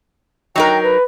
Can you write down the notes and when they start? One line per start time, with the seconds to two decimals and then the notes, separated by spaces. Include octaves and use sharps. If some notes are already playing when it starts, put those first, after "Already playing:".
0.56 F#3 D#4 A#4 G5
0.83 B4